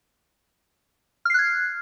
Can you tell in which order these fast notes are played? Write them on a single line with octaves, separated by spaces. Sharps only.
F6 C7 F#6 G#6